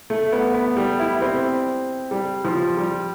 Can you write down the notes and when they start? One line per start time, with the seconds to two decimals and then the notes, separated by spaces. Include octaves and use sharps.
0.10 A3
0.32 B3
0.54 B3
0.77 G3
0.99 E4
1.21 C4
2.11 G3
2.44 F3
2.77 G3